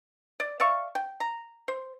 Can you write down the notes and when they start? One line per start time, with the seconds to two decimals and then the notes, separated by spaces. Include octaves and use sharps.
0.40 D5
0.60 D5 E5 F5 C#6
0.95 G5
1.20 A#5
1.68 C5